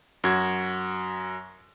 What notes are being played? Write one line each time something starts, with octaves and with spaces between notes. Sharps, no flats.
F#2 F#4 G#6